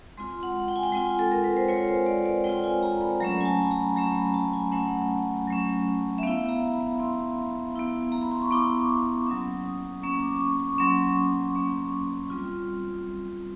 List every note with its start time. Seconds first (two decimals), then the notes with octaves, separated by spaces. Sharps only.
0.17 G#3 C4 F4 C6
0.43 F#5
0.68 G5
0.76 G#5
0.84 G5
0.92 G#3 C4 F4 G#5
1.19 A4
1.32 A#4
1.44 B4
1.57 C5
1.68 G#3 C4 F4 C#5
1.88 C5
2.06 D5
2.26 D5
2.44 G#3 C4 F4 G5
2.64 G#5
2.83 A#5
3.01 B5
3.20 F#3 A3 C#4 A#5
3.41 G#5
3.45 A5
3.63 B5
3.71 A#5
3.96 F#3 A3 C#4 A#5
4.15 B5
4.34 A5
4.53 G#5
4.72 F#3 A3 C#4 F#5
5.48 F#3 A3 C#4
6.18 E5
6.23 B3 E4 F5
6.49 A#5
6.74 B5
6.99 B3 E4 C6
7.76 B3 E4
8.12 A#5
8.22 B5
8.31 C6
8.42 C#6
8.51 B3 E4 D6
9.27 F#3 A#3 C#4 D#6
9.64 D#6
10.02 F#3 A#3 C#4 C#6
10.21 D6
10.41 C#6
10.60 C#6
10.78 F#3 A#3 C#4 C6
11.55 F#3 A#3 C#4
12.30 G3 C4 F4